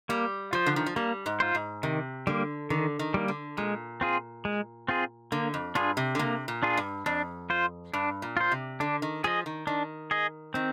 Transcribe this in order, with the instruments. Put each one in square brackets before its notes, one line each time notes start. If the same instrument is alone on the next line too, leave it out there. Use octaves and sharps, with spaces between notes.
[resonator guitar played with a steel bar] G3 [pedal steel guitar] A#3
[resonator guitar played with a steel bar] F3 [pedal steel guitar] F4 C5
[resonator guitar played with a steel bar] D3
D#3
F3
[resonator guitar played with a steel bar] G3 [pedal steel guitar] A#3
[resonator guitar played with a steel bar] G#2
[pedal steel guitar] F4 C5
[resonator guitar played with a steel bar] G#2
[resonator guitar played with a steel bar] C3 [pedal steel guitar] D#3
[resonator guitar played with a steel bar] D3 [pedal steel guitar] G3 A#3
[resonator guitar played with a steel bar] D3 [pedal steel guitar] D#3
[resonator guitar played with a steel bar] D#3
[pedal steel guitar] G3 A#3
[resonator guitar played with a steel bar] D3
[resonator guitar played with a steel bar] A#2 [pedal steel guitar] G#3
[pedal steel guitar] C4 F4 G#4
G#3
C4 F4 G#4
[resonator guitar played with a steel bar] D3 [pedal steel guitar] A#3
[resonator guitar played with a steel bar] F2
[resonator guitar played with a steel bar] G2 [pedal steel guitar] D4 F4 G#4
[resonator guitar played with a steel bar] C3
D3
[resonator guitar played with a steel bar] C3 [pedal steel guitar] A#3
[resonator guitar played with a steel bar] A#2
[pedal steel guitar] D4 F4 G#4
[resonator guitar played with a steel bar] G2
[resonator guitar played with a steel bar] F2 [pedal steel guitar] D4
[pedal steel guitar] F4 C5
[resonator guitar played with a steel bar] G2 [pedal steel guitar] D4
[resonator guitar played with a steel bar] A#2
[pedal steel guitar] F4 C5
[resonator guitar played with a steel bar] C3
[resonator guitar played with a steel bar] D3 [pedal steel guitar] D4
[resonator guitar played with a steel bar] D#3
[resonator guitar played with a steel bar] F3 [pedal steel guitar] G#4 D#5
[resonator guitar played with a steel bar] D#3
[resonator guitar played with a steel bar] D#3 [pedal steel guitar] D4
[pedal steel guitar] G#4 D#5
[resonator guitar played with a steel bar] D#3 [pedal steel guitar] C4